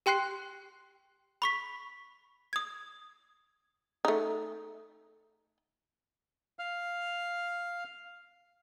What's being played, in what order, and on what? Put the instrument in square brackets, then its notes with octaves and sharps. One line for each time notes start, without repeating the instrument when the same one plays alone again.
[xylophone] G4 G5 C6 F#6 C7
B5 C#6 B6
D#6 G#6
[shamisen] A3 D#4
[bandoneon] F5 F6